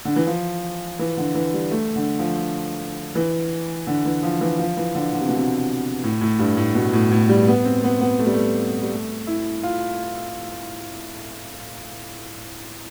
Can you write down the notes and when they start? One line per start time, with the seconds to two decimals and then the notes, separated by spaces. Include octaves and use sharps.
0.05 D3
0.16 E3
0.27 F3
0.99 E3
1.17 D3
1.35 E3
1.54 G3
1.71 A3
1.96 D3
2.19 F3
3.15 E3
3.87 D3
4.05 E3
4.23 F3
4.41 E3
4.59 F3
4.77 E3
4.95 D3
5.13 D3
5.21 C3
5.29 B2
5.37 C3
6.03 A2
6.21 A2
6.39 G2
6.57 A2
6.75 B2
6.93 A2
7.12 A2
7.29 G3
7.47 B3
7.65 C4
7.84 B3
8.01 B3
8.19 A3
8.26 G3
8.34 A3
8.81 G3
8.91 A3
9.27 E4
9.63 F4